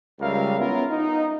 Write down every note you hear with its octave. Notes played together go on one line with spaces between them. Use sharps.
C#2 G3 A#4 E5 F5
B3 C#4 E4 F4 A#4
D#4